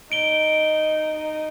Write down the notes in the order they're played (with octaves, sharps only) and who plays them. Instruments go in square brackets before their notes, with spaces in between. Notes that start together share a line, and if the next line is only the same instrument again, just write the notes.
[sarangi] D#4 [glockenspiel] D7 G7
[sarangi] D#4